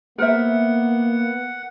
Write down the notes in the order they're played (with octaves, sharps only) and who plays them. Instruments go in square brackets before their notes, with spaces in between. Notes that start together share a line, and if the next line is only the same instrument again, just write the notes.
[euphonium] A#3 [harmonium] B3 [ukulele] A#4 C5 E5 [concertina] F#5